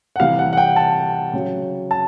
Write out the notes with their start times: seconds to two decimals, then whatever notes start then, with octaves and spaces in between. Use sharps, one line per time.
0.16 F#5
0.20 C3 E3 G3 F5
0.39 F#5
0.53 F#5
0.57 G5
0.76 A5
1.33 C#3 F#3
1.91 A5